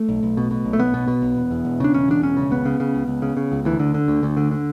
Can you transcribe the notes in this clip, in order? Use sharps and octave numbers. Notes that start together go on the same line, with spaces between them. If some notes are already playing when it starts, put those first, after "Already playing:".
Already playing: A3
B1
B1
B2
B2
B1
A3
B1 B3
B2
B2
B1
E1
E2
E1
C#3 D4
E1 C#4
E2 D4
E1 C#4
C#3
C#2 B3
C#3
C#3
C#2
C#2
C#3
C#3
C#2
D2 E3
D3
D3
D2
D2
D3
D3